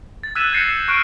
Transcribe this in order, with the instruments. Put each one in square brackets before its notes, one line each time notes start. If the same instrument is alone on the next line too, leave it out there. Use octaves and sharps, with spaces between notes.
[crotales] A6
E6 F#6 G#6 B6 D#7 E7
F#6 G6 A6 A#6 C7 C#7
E7
C#6 F6 F#6 D7